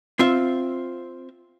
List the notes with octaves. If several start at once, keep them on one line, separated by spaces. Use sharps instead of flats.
C4 F4 E5